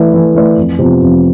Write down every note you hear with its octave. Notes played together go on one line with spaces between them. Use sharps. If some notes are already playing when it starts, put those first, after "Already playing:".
Already playing: E3 A3 E4 B4 D5
E3
A3 E4 B4 D5
F2
C3 F3 B3
F2